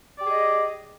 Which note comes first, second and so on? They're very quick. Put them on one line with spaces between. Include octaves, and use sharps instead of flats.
D5 G4 G#4 D#5